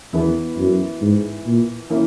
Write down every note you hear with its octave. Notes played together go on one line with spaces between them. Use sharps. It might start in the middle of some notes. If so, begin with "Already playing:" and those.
E2 E3 B3 E4
F#2
G#2
A#2
E3 A#3 C#4 E4